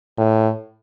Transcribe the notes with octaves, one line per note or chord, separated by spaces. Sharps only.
A2